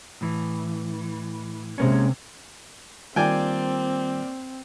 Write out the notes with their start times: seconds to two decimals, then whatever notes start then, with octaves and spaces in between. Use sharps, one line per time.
0.21 A2 E3
1.78 C3 G#3 A#3 C#4
3.16 D#3 G3 A#3 C4 F4 D5 G5 G#5